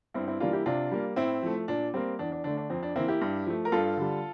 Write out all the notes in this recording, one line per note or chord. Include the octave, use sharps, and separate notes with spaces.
G2 C4 E4
C4 E4
E3 G3 A#3 D4 F4
E4 G4
C3 D4 F4
G3 A#3
A2 C4 E4
F3 A3
A#2 D4
G3 A#3 C4
E2 D4
D4
D3 A3 D4
D4
F2 C4
D4
E3 A#3 C4 E4
E4 G4
G2
F3 A3
A#4
G2 F4 A4
D3 G3